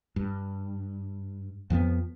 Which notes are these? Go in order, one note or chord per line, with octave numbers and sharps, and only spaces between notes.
G2
F2 F3 A#3 B3